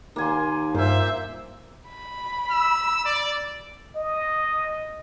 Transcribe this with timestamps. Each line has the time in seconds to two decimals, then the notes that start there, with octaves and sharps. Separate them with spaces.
0.16 D#2 A#3 G#5 C6
0.75 G2 A#2 C5 E5
1.88 B5
2.51 E6
3.05 D5
3.96 D#5